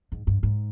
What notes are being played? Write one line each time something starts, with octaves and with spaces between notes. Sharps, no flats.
G#2
G2
G#2